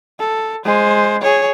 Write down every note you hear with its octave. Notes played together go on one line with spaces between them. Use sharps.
A4
G#3 C5
G#4 C#5